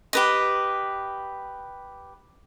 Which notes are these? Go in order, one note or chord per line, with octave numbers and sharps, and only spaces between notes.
G4 B4 D#5